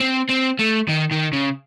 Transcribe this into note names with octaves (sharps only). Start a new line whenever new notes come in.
C4
C4
A3
D#3
D#3
C#3